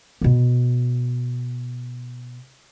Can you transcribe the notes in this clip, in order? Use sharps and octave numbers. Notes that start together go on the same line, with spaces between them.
B2 B3